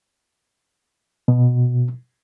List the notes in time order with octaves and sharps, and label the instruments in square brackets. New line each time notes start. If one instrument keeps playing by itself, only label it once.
[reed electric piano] B2